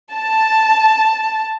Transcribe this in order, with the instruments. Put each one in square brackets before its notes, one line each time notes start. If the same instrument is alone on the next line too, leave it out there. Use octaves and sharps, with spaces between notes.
[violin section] A5